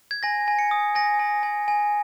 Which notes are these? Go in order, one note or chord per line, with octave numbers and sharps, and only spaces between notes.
G#6
G#5 A#6
G#5
C#7
D#6
G#5 A#6
G#5
G#5
G#5